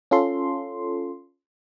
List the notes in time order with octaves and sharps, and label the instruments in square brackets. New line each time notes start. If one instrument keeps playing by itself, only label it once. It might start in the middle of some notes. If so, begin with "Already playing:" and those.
[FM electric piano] C#4 F4 A4 C6